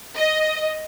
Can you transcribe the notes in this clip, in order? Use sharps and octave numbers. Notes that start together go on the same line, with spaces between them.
D#5